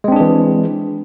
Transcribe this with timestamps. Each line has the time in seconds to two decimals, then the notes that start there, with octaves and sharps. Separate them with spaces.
0.04 G#3
0.08 C4
0.12 D4
0.16 G#4
0.20 E3